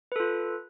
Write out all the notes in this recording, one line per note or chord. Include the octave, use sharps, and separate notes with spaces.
F4 A4 B4